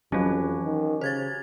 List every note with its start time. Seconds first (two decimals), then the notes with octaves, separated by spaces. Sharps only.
0.12 F2 E3 F#3 C#4 F#4 G4
0.65 D#3
1.01 C#3 C5 G#6 A6